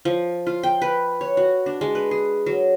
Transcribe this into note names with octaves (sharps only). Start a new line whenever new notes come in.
F3
F4
G5
B4
C#5
F#4
D4
G#3
B4
G#4
F#3